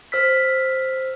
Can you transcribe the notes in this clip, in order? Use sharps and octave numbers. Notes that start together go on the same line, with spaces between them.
C5 E6 F6 B6